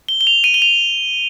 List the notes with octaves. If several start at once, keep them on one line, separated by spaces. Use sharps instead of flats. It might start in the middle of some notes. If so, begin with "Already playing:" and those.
G7
G7
F7
D#7
G7
F7